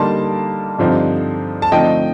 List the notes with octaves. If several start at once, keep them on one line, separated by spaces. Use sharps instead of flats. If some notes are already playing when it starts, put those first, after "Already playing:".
Already playing: D3 G3 A#3 D#4 A5 C6
G2 D3 F3 C4 D#4
A5
D3 F3 A3 C4 D#4 D#5 G5